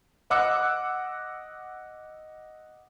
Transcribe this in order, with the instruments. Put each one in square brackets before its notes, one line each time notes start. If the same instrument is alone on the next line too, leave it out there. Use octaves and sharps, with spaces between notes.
[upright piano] D#5 F#5 D6 E6 F#6 C#7